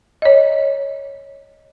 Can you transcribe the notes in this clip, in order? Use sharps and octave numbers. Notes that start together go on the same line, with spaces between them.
C#5 D#5